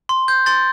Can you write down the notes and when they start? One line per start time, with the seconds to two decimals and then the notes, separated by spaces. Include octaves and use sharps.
0.09 C6
0.28 G6
0.46 C6 A6